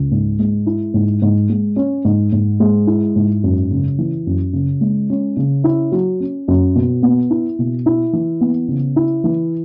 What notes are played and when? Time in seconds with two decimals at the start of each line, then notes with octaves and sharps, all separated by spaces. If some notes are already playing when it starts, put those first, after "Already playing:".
Already playing: C#2
0.11 G#2
0.39 G#3
0.66 E4
0.94 G#2
1.22 G#2
1.49 G#3
1.76 C#4
2.05 G#2
2.32 G#2
2.60 G#3
2.87 E4
3.16 G#2
3.44 F#2
3.71 C#3
3.98 E3
4.27 F#2
4.53 C#3
4.81 G#3
5.10 C#4
5.37 C#3
5.64 E4
5.92 F#3
6.20 C#4
6.48 F#2
6.75 B2
7.03 B3
7.30 E4
7.59 B2
7.86 E4
8.13 E3
8.41 B3
8.68 C#3
8.96 E4
9.24 E3